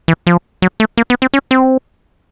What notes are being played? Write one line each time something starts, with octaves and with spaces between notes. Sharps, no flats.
E3
F3
F#3
A3
A#3
B3
C4
C#4
C4